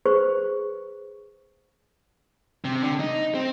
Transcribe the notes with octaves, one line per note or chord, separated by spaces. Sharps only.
G#4 B4 C5 C#6
C3
D3
D#4
C4